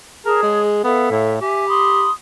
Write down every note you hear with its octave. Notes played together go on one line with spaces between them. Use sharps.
G#4 A#4 C#5 A5
G#3
B3 A4 E5 F5
A2
G4 E5 G#5
B5 C6 D#6